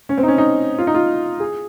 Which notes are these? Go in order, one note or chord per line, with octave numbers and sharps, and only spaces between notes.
C#4
C4
D#4
C#4
D#4
F4
D#4
F4
G#4